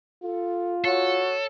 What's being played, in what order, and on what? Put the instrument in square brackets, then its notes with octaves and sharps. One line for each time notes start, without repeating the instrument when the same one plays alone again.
[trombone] F4 [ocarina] A4
[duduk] F#4 [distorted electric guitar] A4 [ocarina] C#5